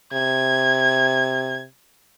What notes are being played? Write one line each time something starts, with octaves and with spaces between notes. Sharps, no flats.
C3 G#6